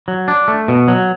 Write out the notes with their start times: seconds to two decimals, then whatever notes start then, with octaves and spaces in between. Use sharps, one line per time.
0.08 F#3
0.28 D4
0.48 A3
0.68 B2
0.88 F#3